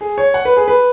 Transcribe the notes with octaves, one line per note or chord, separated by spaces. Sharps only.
G#4
C#5
F#5
B4
G#4
B4